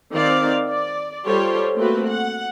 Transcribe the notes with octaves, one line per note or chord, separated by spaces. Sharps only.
D#3 C4 D5 F5
D5
G3 F4 G4 A4 C5 C#5
A3 A#3 C4 F#4 B4
F#5